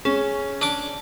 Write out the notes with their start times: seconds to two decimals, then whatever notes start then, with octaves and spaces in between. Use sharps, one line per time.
0.05 C#4 G#4
0.61 D4 D6